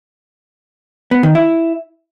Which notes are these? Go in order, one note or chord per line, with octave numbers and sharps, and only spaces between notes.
B3
D#3
E4